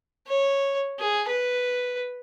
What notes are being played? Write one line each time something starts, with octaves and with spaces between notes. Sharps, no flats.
C#5
G#4
B4